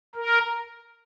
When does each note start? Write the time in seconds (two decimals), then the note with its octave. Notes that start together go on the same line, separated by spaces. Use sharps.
0.15 A#4